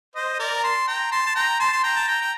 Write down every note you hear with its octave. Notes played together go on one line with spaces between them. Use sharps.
C5 D#5
D#5
A#4 D5
A#5
A5 C6
G5 A#5
A5 C6
A5
G5 A#5
A5 C6
C6
G5 A#5
A5
G5 A#5
G5